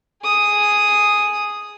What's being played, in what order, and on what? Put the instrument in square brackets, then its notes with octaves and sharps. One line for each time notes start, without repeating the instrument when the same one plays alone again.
[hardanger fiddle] G#4 D#6